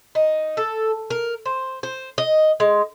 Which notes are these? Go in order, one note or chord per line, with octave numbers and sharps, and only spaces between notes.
D#4
A4
A#4
C5
C5
D#5
G#3